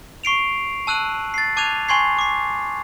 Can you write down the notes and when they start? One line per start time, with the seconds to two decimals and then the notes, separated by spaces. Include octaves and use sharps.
0.24 C#6 C7 D7 F7
0.87 A5 E6 F#6 D#7 F#7
1.34 A6 C7
1.57 A5 D6 F#6 G#6 D#7 F7
1.88 G#5 C6 C#6 G#6 C7
2.19 D6 C7